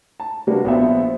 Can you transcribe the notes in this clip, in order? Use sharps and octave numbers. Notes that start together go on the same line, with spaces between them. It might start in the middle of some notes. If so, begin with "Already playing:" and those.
A5
C3 G3 A#3 D4 F#4 B4
A#1 B3 C5 E5